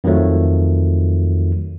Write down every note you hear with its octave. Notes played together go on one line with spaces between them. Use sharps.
F2 D#3 F3 F#3 A3